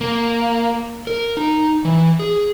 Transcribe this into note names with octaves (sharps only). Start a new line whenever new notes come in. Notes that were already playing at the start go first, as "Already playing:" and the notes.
A#3
A#4
D#4
E3
G#4